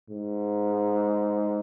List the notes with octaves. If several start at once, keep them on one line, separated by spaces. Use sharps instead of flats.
G#2